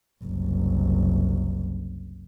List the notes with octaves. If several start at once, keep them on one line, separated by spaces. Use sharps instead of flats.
F#1 C2